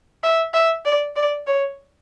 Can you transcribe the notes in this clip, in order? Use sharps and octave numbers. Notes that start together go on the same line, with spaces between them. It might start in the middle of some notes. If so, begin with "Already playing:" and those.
E5
E5
D5
D5
C#5